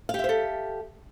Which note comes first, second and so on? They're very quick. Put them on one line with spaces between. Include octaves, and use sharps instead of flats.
F5 G4 E5 C5 A4